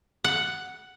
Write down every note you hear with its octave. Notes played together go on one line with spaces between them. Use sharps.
F#5